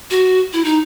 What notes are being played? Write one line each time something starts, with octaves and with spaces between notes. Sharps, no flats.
F#4
E4
D#4